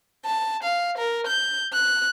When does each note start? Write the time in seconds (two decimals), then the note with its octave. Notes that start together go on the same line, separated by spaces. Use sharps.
0.25 A5
0.63 F5
0.98 A#4
1.26 G6
1.73 F#6